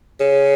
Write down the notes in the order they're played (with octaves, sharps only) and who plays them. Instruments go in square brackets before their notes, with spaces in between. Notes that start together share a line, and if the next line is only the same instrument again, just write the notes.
[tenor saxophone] C#3